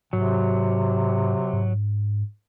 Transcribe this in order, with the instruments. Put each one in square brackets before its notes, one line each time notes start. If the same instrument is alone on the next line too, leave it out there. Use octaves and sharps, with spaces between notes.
[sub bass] G#2 [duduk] C3 [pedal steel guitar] F#3
[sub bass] G#2